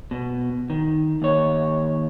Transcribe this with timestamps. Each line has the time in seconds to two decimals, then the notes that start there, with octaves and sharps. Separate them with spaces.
0.11 B2
0.70 D#3
1.22 D#2 C#5